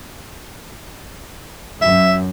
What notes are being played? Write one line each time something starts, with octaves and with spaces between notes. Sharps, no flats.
F#2 E5